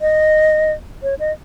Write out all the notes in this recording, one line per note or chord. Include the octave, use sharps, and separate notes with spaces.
D#5
C#5
D#5